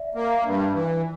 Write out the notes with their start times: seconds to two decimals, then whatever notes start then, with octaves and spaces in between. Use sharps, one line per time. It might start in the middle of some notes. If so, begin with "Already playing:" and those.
Already playing: D5 E5
0.15 A#3
0.43 G2
0.73 E3